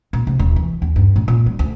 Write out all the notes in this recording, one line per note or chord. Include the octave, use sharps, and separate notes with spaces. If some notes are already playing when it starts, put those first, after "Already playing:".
A#2
C3
D#1
E3
D#2
G2
A2
A#2
G3
D2